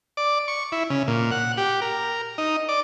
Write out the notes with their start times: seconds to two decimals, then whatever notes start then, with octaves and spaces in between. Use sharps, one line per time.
0.17 D5
0.48 C#6
0.72 E4
0.90 C#3
1.08 A#2
1.31 F#5
1.58 G4
1.82 A#4
2.38 D#4
2.69 D5